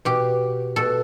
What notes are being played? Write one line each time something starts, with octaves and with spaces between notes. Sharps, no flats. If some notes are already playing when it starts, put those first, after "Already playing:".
B2 G4
B2 A4